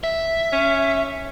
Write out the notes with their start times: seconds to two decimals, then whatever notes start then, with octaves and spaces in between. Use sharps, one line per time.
0.04 E5
0.53 C#4